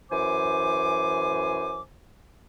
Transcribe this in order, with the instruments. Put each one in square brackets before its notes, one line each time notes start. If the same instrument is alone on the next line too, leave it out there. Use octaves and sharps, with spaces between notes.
[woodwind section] F#2 E3 C5 G#5 D6